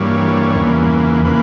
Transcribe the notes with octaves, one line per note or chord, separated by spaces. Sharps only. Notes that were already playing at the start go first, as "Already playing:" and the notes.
Already playing: G2 E3 G3 A#3 C#5
E2 C#3 E3 A#3
C#3 E3 A#3 B4